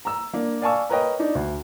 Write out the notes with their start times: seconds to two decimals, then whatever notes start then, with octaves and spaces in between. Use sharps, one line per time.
0.05 A#5 E6
0.33 A#3 D4
0.62 D5 F5 G#5 A5 C#6 E6
0.90 A#4 B4 C#5 D#5 G5
1.19 D4 D#4
1.35 D2